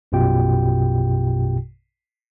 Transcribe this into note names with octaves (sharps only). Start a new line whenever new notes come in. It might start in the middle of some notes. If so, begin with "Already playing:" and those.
A#1 F#2 B2 F4 G4 G5